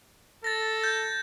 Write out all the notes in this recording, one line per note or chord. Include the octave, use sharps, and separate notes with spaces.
A4 A6 A#6
G6